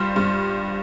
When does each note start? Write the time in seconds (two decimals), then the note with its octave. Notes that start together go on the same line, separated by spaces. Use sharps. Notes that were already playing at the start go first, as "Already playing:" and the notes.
Already playing: G2 G3 F4 C5
0.16 G2